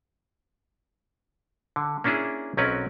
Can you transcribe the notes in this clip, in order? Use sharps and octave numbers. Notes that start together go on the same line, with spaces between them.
D3
A#3 C#4 D4 E4 G#4
B1 F#3 C4 C#4 A#4 B4